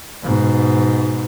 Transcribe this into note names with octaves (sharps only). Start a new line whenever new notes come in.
G#2 B2